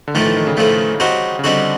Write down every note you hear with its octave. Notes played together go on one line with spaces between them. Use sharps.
D3
A2 D#3 F3 A3
E3
D#3
C#3
A2 C#3 F3 A3
G3 C4 D#4 F#4
C#3
D3 G3 C4 D#4 F#4